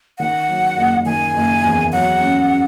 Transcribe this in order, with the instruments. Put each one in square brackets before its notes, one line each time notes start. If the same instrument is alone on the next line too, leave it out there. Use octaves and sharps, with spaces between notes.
[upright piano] D#3 [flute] F#5
[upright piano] F#3
F#1
[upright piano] D#3 [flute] G#5
[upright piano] F#1
E2
[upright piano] F#3 [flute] F#5
[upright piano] C#4